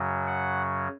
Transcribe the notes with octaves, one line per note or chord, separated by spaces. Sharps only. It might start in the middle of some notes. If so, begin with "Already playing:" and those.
Already playing: F#2 C#3 F#3
F#5